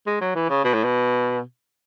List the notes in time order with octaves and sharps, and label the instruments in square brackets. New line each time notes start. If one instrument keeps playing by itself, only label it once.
[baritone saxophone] G#3
F#3
E3
C#3
B2
A2
B2